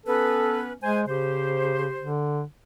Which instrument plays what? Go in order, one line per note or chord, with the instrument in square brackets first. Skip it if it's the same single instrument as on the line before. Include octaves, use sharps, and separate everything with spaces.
[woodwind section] B3 C#4 B4 [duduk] A4
[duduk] G#3 [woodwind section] C5 G#5
[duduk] C#3 [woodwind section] G4 C5
[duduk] D3